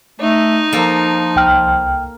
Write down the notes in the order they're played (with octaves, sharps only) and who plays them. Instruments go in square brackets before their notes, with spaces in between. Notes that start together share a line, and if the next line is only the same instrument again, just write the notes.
[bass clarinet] A3 [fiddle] D#4
[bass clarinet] F3 [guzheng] A#3 A4
[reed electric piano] C2 G5 F6